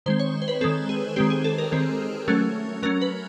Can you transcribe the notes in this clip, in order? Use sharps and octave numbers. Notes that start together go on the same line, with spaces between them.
D#3 G#3 C4 C5
C#5
C5
B4
D#3 G#3 C4 A4
G#4
D#3 G#3 C4 G4
G#4
A4
A#4
D#3 G#3 C4
F#3 A3 C#4
F#3 A3 C#4 A#4
B4